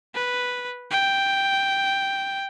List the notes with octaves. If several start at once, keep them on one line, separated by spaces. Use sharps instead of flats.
B4
G5